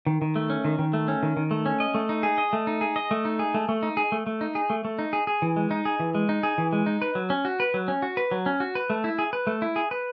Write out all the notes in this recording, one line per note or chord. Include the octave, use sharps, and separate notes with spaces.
D#3
D#3
A3
C#4
D#3
D#3
A3
C#4
D#3
D#3
A3
C#4
D#5
A3
D#4
G#4
D#5
A3
D#4
G#4
D#5
A3
D#4
G#4
A3
A3
D#4
G#4
A3
A3
D#4
G#4
A3
A3
D#4
G#4
G#4
E3
G#3
D#4
G#4
E3
G#3
D#4
G#4
E3
G#3
D#4
B4
F#3
C#4
F#4
B4
F#3
C#4
F#4
B4
F#3
C#4
F#4
B4
A3
E4
G#4
B4
A3
E4
G#4
B4